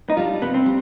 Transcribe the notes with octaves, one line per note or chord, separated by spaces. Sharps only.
D#4
G3 D4 F4
C3 B3
C4
G3